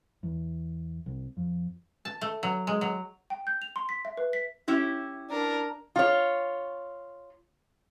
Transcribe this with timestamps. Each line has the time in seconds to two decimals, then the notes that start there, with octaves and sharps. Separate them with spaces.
0.23 E2
1.06 C2
1.37 F2
2.05 A5
2.21 A3
2.43 F#3
2.67 G#3
2.81 F#3
3.30 G5
3.47 G6
3.62 F7
3.76 C6
3.89 B6
4.05 E5
4.17 B4
4.33 B6
4.68 C#4 E4 G4
5.30 D4 A#4
5.96 F4 C#5